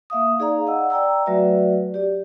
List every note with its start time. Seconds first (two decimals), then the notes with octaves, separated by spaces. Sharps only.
0.10 A#3 E5 F5 D#6
0.39 D#4 G#4 D5 F5 A#5
0.67 D#5 F#5 E6
0.90 D5 G5 A#5 E6
1.26 F#3 A3 F#4 B4 D5 E5
1.94 G4 D5